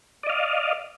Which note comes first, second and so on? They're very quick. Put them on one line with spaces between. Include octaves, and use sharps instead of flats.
D5 D#5 F5